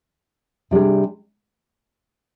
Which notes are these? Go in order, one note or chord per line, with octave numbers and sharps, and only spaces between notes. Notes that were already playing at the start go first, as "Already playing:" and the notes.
C3 G3 D4 G#4